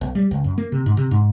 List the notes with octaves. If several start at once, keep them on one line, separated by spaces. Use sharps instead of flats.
B1
G3
C#2
F#2
A#3
C3
G#2
C3
G#2